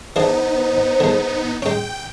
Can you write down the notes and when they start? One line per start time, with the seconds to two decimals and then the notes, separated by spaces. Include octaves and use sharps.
0.16 E3 B3 D4 D#4 G#4 C5
1.00 D3 G#3
1.62 G#3 C#4 G5